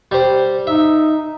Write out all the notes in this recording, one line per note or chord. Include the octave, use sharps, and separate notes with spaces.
G3 C5
D#4 E5